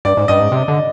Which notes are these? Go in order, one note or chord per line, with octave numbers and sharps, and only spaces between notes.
G2 D5
G#2
G2 D#5
G#2
C3
D3